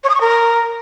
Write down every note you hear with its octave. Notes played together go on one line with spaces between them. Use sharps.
C#5
D#6
C#6
A#4